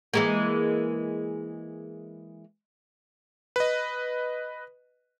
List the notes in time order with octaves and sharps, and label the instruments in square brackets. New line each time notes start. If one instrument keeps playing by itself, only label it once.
[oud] E3 G#3 A#3
[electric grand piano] B4 D#5